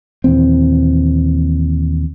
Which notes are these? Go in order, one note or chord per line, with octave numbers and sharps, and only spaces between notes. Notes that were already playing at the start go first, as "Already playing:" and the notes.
D#2 A#2 E3 C4